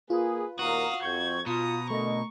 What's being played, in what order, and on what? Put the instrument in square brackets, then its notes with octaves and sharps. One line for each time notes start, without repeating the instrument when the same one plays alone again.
[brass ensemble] A#3 G#4 [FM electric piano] F4 [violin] B4
[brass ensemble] D#2 A#2 A#4 [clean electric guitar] F#4 [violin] F5 D#6
[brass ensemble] F2 [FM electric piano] C#6 G6 [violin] G#6
[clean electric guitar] B2 [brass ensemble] F4 [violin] A#5 D#6 [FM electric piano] C#7
[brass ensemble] D3 A#4 D#5 [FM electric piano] A3 A#5 [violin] C#6